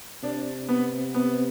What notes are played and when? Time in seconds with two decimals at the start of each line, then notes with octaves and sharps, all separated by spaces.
0.23 C3 D4
0.69 B3
1.15 B3